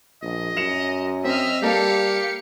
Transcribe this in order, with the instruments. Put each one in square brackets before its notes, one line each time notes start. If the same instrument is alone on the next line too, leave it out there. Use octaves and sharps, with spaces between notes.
[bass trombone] A#1 [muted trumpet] D#5
[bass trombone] F#2 [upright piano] C#7 E7 F7
[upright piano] C4 [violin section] D#5 F6 [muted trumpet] E5
[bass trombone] G3 [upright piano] A#3 A4 [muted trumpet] G4 [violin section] F5 C#7